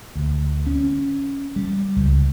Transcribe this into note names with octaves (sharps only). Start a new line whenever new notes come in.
D2
C#4
G3
C#2